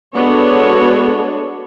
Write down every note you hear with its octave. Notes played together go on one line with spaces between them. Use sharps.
G#3 B3 D4 F#4 A4 C#5